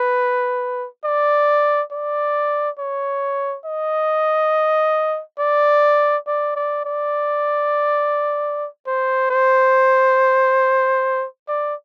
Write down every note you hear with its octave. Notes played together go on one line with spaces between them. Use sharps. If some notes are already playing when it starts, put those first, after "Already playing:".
Already playing: B4
D5
D5
C#5
D#5
D5
D5
D5
D5
C5
C5
D5